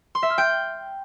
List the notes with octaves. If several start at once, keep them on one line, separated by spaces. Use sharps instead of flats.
C6
E5
F6
G5